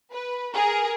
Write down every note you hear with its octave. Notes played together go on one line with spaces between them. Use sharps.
B4
G#4 A#4